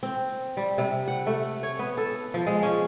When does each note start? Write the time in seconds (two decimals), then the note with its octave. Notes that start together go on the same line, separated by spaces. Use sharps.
0.03 C4
0.57 G3
0.78 C3
1.08 F#5
1.27 A3
1.63 C#5
1.79 B3
1.98 A4
2.34 F3
2.47 G#3
2.63 C#4